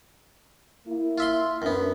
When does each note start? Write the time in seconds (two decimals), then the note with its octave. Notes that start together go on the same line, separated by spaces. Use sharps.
0.87 A#3 E4
1.18 F4 E5 C6
1.62 F#2 B3 D4